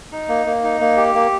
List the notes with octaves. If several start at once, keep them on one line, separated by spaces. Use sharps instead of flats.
D#4
A#3
A#3
D#4
A#3
G4
A#3